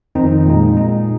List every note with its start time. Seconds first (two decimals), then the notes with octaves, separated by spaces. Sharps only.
0.15 F2 D#3 C4 D#4
0.45 A#2 G#3 D#4
0.76 A#2 G#3 D#4